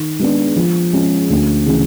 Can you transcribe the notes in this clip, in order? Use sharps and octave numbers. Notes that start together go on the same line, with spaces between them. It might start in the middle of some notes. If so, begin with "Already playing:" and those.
Already playing: D#3
G#3 B3 D4
F3
G#3 C#4
D2
C#3 E3